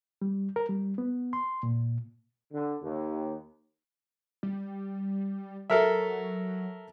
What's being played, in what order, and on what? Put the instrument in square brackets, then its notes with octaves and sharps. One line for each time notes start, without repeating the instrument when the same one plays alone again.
[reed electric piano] G3
A#4
G3
B3
C6
A#2
[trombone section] D3
D#2
[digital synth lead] G3
[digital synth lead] F#3 [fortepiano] A4 A#4 E5